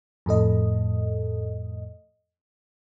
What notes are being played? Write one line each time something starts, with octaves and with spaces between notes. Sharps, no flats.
F2 A2 A4 D#5